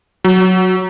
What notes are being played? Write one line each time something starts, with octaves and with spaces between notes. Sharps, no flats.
F#3